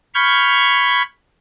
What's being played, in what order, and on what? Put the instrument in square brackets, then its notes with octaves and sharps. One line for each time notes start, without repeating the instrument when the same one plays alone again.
[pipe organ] B5 C#6 F6 G6 G#6